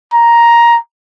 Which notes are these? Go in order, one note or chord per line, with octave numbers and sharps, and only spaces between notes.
A#5